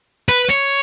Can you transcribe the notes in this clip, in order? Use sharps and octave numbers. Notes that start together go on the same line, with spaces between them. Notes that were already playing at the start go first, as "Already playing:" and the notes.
B4
C#5